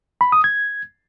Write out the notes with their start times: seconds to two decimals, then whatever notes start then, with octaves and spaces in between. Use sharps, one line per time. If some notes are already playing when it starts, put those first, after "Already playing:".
0.21 B5
0.32 D#6
0.44 G#6